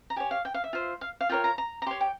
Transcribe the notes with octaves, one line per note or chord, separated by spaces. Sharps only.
A#5
G4 C#5 G#5
F5
G5
F5
E5
F4 C5
F5
F5
F4 A#4 C#5 G5
A#5
A#5
A#5
G4 C#5 C6
G5